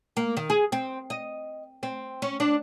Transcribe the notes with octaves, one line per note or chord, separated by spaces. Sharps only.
A#3
D#3
G#4
C4
D#5
C4
C#4
D4